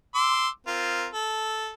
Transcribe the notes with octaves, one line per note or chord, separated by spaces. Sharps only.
C6 D6 E6
C4 F4 A#4
A4